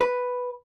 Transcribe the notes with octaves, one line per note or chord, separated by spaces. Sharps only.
B4